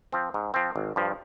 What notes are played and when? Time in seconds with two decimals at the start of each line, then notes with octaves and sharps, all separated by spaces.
0.12 F3 C4
0.34 G#2
0.54 F3 C4
0.76 G#1
0.96 G2 F3